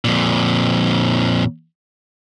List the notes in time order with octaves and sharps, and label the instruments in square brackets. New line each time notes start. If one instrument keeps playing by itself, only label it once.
[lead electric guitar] F2 A#2